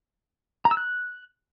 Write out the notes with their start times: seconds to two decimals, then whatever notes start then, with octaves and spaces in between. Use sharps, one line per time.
0.65 A#5
0.71 E6
0.77 F#6